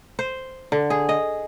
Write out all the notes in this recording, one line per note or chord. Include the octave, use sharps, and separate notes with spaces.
C5
D3
G#4
D#5